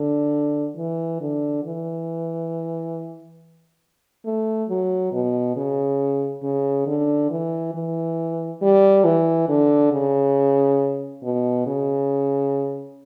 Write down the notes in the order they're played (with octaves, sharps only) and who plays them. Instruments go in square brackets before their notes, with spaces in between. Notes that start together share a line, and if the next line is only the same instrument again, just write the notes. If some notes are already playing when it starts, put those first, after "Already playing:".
Already playing: [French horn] D3
E3
D3
E3
A3
F#3
B2
C#3
C#3
D3
E3
E3
G3
E3
D3
C#3
B2
C#3